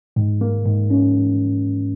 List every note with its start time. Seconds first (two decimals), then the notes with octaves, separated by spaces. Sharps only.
0.16 G#2
0.41 A#3
0.65 G#2
0.90 C#4